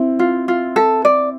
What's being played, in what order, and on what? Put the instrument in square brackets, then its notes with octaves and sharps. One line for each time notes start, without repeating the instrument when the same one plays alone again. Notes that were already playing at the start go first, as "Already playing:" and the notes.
Already playing: [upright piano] C4 E4
[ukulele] F4
F4
A4
D5